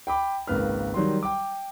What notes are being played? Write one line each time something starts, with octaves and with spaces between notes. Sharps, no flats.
G5 B5 D6
G#1 C#2 A#3 B4 F6
D#3 F#3 G3 C6
G5 D6